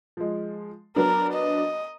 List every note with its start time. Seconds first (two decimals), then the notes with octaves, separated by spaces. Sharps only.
0.17 F3 G#3
0.96 F#3 B3 D4 A#4
1.33 D#5